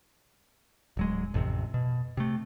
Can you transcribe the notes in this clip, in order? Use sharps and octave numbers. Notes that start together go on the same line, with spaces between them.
D1 F#3 G#3
A1 F2 C3
B2
C3 A3